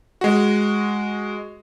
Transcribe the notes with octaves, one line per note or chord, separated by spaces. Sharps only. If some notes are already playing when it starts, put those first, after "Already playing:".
G#3 F#4